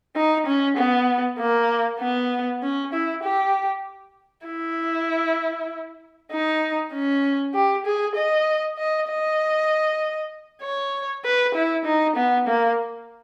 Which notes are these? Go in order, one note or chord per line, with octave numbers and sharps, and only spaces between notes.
D#4
C#4
B3
A#3
B3
C#4
E4
G4
E4
D#4
C#4
G4
G#4
D#5
D#5
D#5
C#5
B4
E4
D#4
B3
A#3